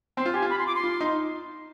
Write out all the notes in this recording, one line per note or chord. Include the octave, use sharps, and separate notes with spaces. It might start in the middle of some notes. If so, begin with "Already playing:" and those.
C4 C6
F4
G4 G#5
F4
B5
C6
D6
C6
F4
D#4